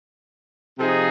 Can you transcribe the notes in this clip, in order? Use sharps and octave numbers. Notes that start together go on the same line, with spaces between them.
C3 F3 C4 D#4 G#4